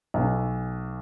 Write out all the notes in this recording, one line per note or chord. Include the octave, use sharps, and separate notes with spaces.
B1